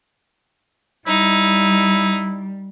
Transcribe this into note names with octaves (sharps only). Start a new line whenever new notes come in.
G3 D#4 E4